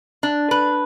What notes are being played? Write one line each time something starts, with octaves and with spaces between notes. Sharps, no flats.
D4
B4